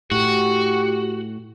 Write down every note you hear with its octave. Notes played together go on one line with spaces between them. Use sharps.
A2 F#4 G4